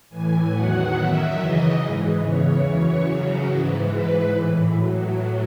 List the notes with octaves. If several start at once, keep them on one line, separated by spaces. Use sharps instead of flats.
A2 E3 G#5
E2 D#3 F#3 F#5
F#2 D#3 F#3 E5
F#2 C#3 E3 D#5
G#2 E3
E2 C#3 E3 C#5
F#2 E3 C#5
F#2 C#3 F#3
G#2 E3
G#2 E3 B4
A2 E3
A2 F#3